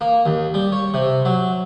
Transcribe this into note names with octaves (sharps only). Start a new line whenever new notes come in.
A#3
D#2
G3
C#5
C3
F#3